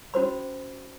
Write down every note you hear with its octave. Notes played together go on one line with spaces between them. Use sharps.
C#4 F#4 C5 B5